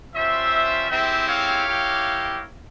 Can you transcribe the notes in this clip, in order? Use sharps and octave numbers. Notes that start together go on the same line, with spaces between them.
G3 C#4 F4 C5 E5
G#3 C4 E4 G4 C5 E5
C#5 F5
A#3 E4 G4